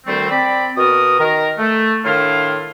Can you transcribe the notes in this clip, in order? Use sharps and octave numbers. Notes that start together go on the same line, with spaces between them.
D2 D#3 G3 A3 C4
C4 D5 B5
B2 F#4 A#4 D#6
D#3 A#4
A3
A2 D#3 D4 E4 F4 F5